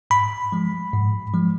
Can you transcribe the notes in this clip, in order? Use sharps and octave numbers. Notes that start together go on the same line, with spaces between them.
G#2 B5
F3 G#3
G#2
F3 G#3